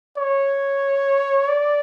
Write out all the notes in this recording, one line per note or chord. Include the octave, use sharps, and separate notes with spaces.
C#5
D5